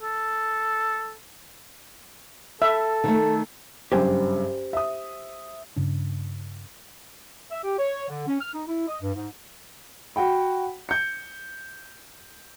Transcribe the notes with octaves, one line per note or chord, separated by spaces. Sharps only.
A4
A4 E5
D#3 A3
F#1 G2 G4 C5 G#5
E5 D#6
G2 C#3 D4
E5
G4
C#5
D3
C#4
F6
D#4
E4
D#5
G2
G#2
F#4 F#5 G5 B5
G6 C#7